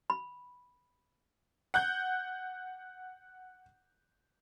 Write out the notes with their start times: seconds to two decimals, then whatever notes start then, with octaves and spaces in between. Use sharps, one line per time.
0.10 B5
1.74 F#5 F#6 G6